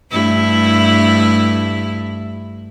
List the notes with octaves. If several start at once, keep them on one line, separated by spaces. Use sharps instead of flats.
G2 A3 E4